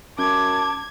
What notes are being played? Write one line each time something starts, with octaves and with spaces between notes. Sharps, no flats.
F#2 A5 D6 G#6